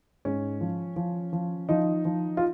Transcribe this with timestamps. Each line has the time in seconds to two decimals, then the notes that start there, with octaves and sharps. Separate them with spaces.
0.25 G#2 C#4
0.61 F3
0.96 F3
1.33 F3
1.69 F3 D#4
2.05 F3
2.37 F4